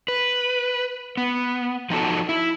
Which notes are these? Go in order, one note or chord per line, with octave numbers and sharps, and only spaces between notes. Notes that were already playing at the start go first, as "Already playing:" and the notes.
B4
B3
F3 D#4 F#4 A4
E4